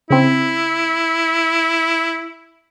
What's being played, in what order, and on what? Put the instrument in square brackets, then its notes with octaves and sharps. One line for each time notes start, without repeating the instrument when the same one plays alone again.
[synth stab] C#3 C4 [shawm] E4